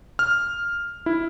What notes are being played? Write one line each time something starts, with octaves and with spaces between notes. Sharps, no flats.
F6
E4